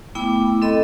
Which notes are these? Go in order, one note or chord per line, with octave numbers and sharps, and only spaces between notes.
A3 B3 E4 G5 B5 D6
C4 A4 D#5 B5